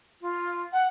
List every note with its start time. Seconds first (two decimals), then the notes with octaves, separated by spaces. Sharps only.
0.21 F4
0.73 F#5